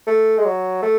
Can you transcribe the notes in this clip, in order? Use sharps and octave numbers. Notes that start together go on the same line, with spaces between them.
A3
G#3
F#3
A3